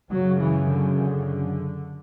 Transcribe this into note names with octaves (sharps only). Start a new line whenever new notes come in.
F#2 C#3 F#3
E3
D3
D3